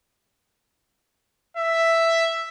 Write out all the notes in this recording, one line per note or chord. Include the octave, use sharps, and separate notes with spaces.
E5